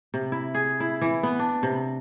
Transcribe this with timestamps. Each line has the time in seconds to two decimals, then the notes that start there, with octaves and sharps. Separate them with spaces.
0.14 C3
0.32 E4
0.55 G#4
0.80 E4
1.02 E3
1.23 B3
1.39 D4
1.63 C3